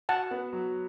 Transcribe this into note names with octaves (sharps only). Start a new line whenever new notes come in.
F#4 F#5 A5
B3
F#3